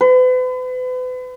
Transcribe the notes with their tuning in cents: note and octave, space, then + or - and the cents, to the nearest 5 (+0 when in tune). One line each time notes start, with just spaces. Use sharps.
B4 +40